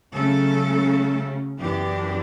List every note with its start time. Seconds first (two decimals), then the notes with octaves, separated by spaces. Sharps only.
0.13 C#3 F#3 A3 C#4 A4
1.60 F#2 E3 B3 D4 G4